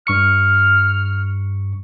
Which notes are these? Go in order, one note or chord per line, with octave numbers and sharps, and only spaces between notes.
G2 C#6 F6 C#7